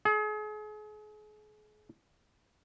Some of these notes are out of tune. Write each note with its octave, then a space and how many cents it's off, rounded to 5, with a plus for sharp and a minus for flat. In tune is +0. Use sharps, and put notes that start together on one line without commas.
G#4 +35